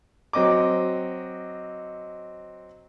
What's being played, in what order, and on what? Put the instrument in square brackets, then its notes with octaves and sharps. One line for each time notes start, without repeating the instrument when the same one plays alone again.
[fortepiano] F#3 C4 D#5 D6